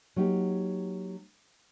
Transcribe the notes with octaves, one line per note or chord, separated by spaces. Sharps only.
F#3 A#3 D#4 G4